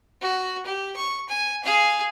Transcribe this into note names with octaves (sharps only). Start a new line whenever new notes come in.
F#4
G4
C#6
G#5
G#4 F5